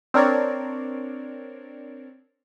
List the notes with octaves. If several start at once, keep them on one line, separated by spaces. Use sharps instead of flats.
C4 D4 A#4 C#5 D5